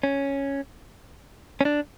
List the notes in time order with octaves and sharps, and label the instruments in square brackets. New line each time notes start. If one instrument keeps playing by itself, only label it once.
[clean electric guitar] C#4
C#4
D4